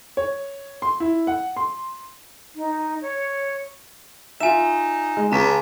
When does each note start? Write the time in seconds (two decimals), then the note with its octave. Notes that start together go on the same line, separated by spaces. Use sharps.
0.17 C#5
0.82 C6
1.00 E4
1.27 F#5
1.56 C6
2.55 D#4
3.02 C#5
4.41 D#4 F4 E5 G#5 E7
5.17 G#3
5.32 C#2 C#3 A5 A#5 B6